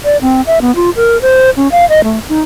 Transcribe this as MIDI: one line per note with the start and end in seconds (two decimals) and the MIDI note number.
0.04 0.17 74
0.22 0.41 60
0.47 0.59 76
0.61 0.74 59
0.76 0.90 65
0.96 1.20 70
1.22 1.50 72
1.57 1.68 61
1.72 1.85 77
1.90 2.03 75
2.04 2.19 57
2.29 2.39 63